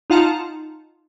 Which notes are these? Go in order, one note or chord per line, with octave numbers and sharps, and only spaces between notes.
D#4 F4 F5 F#5 A5 A#5